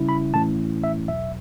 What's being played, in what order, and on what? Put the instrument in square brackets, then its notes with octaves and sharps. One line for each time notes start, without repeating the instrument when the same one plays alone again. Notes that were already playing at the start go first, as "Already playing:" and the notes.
Already playing: [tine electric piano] C#3 G3 C#4 E4
B5
A2 E3 A3 C#4 E4 A5
E5
E2 B2 F#3 E5